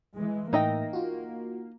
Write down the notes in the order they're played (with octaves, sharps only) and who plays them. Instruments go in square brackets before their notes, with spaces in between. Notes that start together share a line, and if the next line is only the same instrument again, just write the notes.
[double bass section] E3 G#3
[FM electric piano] A2 E5 A#6 [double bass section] A#3 [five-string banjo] D#4 D#5 G5
[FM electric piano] F4 F#4